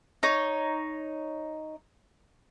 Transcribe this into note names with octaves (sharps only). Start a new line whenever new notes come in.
D#4 C#5